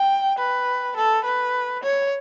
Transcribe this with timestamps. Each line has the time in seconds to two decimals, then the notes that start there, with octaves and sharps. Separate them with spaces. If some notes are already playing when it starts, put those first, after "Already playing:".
Already playing: G5
0.38 B4
0.97 A4
1.25 B4
1.83 C#5